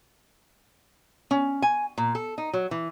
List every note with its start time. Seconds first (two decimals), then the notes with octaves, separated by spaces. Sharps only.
1.31 C#4
1.62 G#5
1.98 A#2
2.15 A4
2.38 D#4
2.53 F#3
2.71 E3